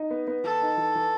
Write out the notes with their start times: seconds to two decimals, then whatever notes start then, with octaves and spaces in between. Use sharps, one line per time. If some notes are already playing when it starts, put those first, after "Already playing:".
Already playing: D#4
0.11 B3
0.27 B3
0.44 E3 A4
0.62 D#4
0.77 E3
0.95 E3